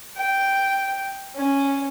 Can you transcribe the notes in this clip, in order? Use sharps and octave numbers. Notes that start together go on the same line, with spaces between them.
G5
C#4